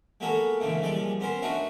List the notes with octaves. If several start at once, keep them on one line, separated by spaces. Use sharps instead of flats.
G#3 A#3 B3 F#4 A4 A#4
G#2 C#3 E3 A3 A#3
A#2 F3 G3 G#3 D5
B3 C#4 A#4 C5
A3 D4 D#4 F#4 A#4 C#6